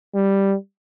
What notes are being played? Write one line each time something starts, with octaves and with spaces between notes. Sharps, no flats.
G3